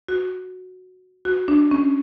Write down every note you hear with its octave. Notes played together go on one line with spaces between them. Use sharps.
F#4
F#4
D4
C#4